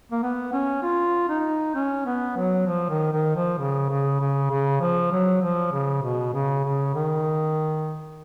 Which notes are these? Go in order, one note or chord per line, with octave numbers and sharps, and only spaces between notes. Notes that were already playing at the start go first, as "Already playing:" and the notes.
A#3
B3
C#4
F4
D#4
C#4
B3
F#3
F3
D#3
D#3
F3
C#3
C#3
C#3
C#3
F3
F#3
F3
C#3
B2
C#3
C#3
D#3